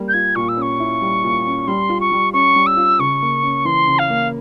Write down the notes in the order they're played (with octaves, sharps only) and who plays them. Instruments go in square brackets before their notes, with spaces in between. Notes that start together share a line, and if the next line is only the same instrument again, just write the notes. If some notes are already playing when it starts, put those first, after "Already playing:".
Already playing: [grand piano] G3 A#3
[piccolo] G6
[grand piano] F4 [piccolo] G#6
[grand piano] A#2 [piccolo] C#6
[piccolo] E6
[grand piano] C#4 [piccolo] C#6
[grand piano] E4
G3
A#2
C#4
[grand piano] G3 [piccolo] C6
[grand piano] F4
[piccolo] C#6
[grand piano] G3
[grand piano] C#4 [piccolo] C#6
[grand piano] G3
[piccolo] E6
[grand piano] F4
[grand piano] C#3 [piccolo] C#6
[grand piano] A#3
C#4
[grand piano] E3 [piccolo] C6
[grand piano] C#3
[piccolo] F5
[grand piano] A#3